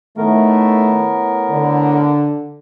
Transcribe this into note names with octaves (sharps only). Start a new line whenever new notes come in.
A2 D#3 A3 B3 A#4
D3